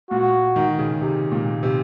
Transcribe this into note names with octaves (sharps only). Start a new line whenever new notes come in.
A#2 F#4
D#3
C#3
C3
A#2
C3